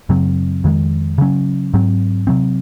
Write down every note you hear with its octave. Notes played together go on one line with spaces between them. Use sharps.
F#2 C#3 F#3 C4
F2 D#3 G#3
C#3 F#3 C#4
G#2 F#3 C4
C3 F#3 C4